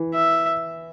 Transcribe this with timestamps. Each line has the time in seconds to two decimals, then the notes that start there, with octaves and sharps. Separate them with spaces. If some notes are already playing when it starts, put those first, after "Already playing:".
Already playing: E3
0.14 E5